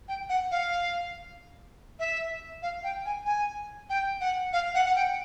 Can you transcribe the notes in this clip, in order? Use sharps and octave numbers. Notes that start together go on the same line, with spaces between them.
G5
F#5
F5
E5
F5
G5
G#5
G#5
G5
F#5
F5
F#5
F#5
G5